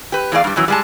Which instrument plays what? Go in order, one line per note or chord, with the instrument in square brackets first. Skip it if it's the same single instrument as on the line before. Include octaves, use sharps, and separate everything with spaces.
[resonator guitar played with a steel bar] G4 B4
E2 A2 G#4 D5 F5
G2 G3
F#2 B2 E3 F#3
G3 G#3 A5